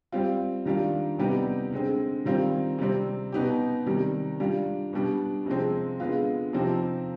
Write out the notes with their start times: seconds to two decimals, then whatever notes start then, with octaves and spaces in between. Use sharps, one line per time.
0.12 G3 C4 F4
0.65 D#3 G3 D4 F4
1.19 C3 G3 B3 D#4 G4
1.72 D3 G#3 C4
2.25 D#3 G3 C4 F4
2.79 C3 G3 C4
3.32 B2 B3 D#4 G4
3.86 C3 D#3 G3
4.40 G3 D4 F4
4.93 B2 G3 D4
5.46 C3 F3 G#3 C4
6.00 D3 G#3 B3 F4
6.53 C3 F3 C4 D#4 G4